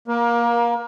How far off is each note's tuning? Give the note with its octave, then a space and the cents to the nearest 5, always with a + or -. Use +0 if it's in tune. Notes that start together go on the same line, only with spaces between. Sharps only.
A#3 +20 A#4 +30